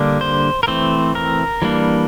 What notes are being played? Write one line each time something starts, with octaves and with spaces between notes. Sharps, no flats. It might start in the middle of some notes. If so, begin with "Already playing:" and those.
Already playing: D3 G3 A#3 D4
C5
A#4
E3 A3 C4 C5
A#4
E3 G3 A#3 D4